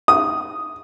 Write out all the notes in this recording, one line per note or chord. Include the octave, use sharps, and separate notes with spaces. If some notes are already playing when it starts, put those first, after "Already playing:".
D#6